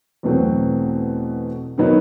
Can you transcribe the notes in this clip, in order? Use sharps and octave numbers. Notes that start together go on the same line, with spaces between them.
E2 B2 F#3 A3 C4
D#3 F#3 B3 D#4